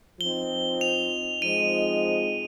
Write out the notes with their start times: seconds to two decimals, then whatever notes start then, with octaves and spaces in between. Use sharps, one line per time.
0.20 F3 C4 D#4 G7
0.81 F7
1.42 F3 G#3 C4 D#4 D#7